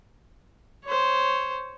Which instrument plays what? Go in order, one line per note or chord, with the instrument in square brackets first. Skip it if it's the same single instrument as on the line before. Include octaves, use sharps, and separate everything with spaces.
[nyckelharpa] C5 C#5